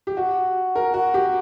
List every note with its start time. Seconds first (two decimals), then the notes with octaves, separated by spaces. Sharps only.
0.07 G4
0.17 F#4
0.75 A#4
0.94 F#4
1.14 G4